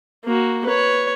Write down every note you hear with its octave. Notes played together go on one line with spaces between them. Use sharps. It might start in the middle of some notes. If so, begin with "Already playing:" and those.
A#3 F#4
B4 C#5